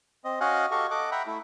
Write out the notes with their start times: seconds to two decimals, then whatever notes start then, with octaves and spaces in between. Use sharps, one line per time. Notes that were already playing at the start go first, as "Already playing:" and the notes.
0.24 C4 D#5
0.41 C#4 F#4 D#5 F5 F#5 G#5
0.71 F#4 G4 A4 D#5 F5 C#6
0.91 A4 D#5 F#5 D6
1.12 E5 F#5 G5 A#5 B5
1.27 A3 E4